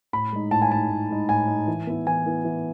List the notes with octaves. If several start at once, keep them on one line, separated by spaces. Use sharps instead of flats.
A2 B5
G#3 D#4
A2 A5
G#5
G#3 D#4 A5
A2
G#3 D#4
A2 G#5
G#3 D#4
E3
B3 E4
E3 G#5
B3 E4
E3